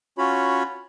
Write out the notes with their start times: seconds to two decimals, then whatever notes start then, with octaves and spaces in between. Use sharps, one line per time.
0.18 C#4 F4 F#4 C#5 B5